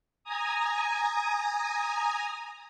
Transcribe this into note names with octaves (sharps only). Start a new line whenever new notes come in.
G#5 A#5 D#6